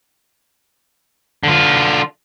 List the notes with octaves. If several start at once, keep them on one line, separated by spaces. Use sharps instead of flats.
D3 F4